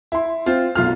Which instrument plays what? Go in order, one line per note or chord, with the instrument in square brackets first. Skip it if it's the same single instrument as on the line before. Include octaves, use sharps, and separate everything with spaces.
[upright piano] E4 C6
C4 F4
B1 F4 F6